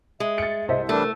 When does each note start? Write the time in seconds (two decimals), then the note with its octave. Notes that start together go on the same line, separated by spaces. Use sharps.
0.20 G#3 E5
0.38 A6 C#7
0.68 C2 C5 D#5 E5
0.89 E3 G3 A3 D4 A#4